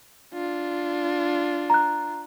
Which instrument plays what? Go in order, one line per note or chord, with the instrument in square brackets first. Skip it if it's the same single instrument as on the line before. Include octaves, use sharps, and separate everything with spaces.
[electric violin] D4 F4
[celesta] A#5 F#6